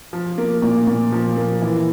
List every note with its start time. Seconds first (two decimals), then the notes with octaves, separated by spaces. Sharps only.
0.13 F3
0.38 A#3
0.62 A#2
0.87 A#2
1.12 F3
1.37 A#3
1.62 E3